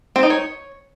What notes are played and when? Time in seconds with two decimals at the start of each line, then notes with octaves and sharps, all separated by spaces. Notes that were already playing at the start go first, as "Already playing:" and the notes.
0.16 C4
0.23 D#4
0.30 C#5